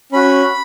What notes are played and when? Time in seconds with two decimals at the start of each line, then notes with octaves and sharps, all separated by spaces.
0.12 C#4 F#4 B5